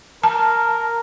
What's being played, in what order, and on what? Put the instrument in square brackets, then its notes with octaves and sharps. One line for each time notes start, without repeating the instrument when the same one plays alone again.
[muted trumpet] A#4 [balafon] A5